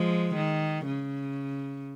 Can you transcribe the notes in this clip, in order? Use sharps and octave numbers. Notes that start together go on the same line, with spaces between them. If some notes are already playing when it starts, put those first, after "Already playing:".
Already playing: F3 G#3
D#3
C#3